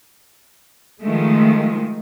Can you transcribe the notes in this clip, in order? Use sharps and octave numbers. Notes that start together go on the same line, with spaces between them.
D#3 F3 G#3 A3